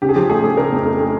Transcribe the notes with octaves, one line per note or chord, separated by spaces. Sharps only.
C#3 G4
G#4
F3 G4
A3 G#4
A3
C#3 A#4
F2
A3
A3